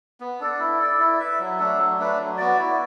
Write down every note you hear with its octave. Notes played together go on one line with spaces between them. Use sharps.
B3
D4 A4 D5
E4
A4 D5
E4
B4 E5
F#3
A3 D4 A4
F#3
A3 D4 B4
F#3
B3 F#4 D5
E4